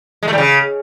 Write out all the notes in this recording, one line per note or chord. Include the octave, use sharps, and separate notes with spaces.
G#3
A3
G3
C#3